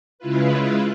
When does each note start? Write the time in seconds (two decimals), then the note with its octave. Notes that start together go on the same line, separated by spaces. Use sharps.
0.19 C#3 G#3 E4 F4 B4